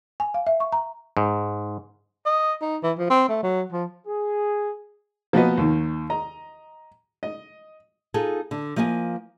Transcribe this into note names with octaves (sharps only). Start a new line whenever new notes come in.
G#5
F5
E5
C#6
A#5
G#2
D#5
D#4
E3
F3
C4
A3
F#3
F3
G#4
F3 A#3 B3 F#4 B4 D#5
D#2 D#3
D#5 A#5
D#5
D#4 F4 G#4 A4
D3
F3 A#3 D#5 F5 G#5